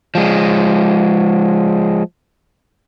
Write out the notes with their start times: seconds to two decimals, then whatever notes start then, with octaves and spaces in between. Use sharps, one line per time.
0.15 F3 G#3